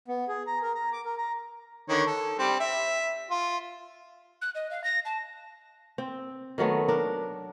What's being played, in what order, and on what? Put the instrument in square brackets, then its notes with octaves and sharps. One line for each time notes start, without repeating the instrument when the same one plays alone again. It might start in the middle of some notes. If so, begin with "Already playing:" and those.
[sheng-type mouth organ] B3
G#4
A#5
A#4
A#5
D6
A#4
A#5
[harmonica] D3 D#3 C#5
A4
G3 C4
E5
F4
[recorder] F#6
D#5
F5
A#6
A5
[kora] C4
D#3 F#3 A3 B3
D4 A#4